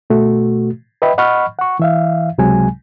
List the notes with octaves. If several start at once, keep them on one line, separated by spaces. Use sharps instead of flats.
B2 A3 F#4
B4 D#5 E5 G5 B5
D#5 F#5 B5 C#6 F6
F#5 C#6
E3 E5 F5
C#2 C3 F#3 G#3 G#5